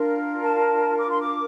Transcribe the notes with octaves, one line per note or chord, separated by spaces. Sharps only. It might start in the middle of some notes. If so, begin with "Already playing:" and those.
Already playing: D4 F4 A#4
A5
D6
C6
D6